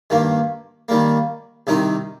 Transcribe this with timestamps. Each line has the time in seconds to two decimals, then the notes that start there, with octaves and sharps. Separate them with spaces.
0.10 G2 D#3 A#3
0.89 D#3 G3 A#3
1.67 C2 C3 D#3 C4 D#4